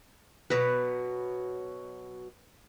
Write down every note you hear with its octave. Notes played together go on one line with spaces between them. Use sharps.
B2 F#3 B4